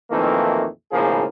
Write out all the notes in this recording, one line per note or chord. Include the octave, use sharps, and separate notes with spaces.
B1 F2 D#3 E3 A3 A#3
G#1 A2 C#3 F3 A#3 G#4